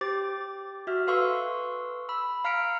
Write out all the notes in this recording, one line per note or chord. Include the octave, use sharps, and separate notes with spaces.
G4 C5 D6 A6
F#4 E5 F6
A4 B4 F5 C6 C#6 E6
B5 E6
F5 A#5 F6 B6 C#7 D7